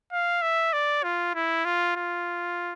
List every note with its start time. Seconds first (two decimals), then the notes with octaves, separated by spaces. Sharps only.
0.12 F5
0.42 E5
0.73 D5
1.03 F4
1.34 E4
1.65 F4
1.96 F4